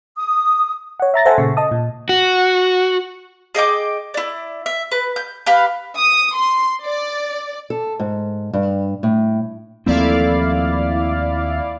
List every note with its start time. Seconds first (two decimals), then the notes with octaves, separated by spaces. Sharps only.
0.16 D#6
1.00 C#5 F#5
1.14 E5 A#5 A6 A#6
1.25 A4 C5 E5 F#5 G#5 A5
1.38 A#2 C#3 C#6
1.57 D#5 A5 D#6
1.72 A#2
2.09 F#4
3.55 G#4 D#5 G5 D6
4.14 E4 D5
4.66 E5
4.91 B4
5.16 G6
5.46 G4 B4 F5 B5
6.00 D#6
6.35 C6
6.86 D5
7.70 A4
8.00 G#2
8.53 G2
9.03 A2
9.86 D#2 F3 A3 A#3 C4 E4 D5 F5